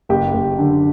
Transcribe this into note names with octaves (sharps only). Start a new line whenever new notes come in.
F#1 G4
F#1
D3